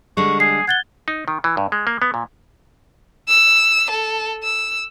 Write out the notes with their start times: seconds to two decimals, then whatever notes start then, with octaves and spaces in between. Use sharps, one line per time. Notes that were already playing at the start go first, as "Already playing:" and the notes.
0.17 D3 G3 G#3 C#6
0.40 G#4 C7
0.68 F#5 G#6 A6 G7
1.08 D#4
1.28 D#3
1.44 E3
1.57 G2
1.72 G#3
1.87 A#3
2.02 B3
2.14 A#2
3.28 E6
3.90 A4
4.43 E6